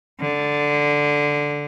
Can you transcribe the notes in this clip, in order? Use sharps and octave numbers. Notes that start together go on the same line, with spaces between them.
D3